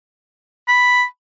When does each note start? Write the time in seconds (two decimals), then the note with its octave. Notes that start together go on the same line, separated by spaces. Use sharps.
0.68 B5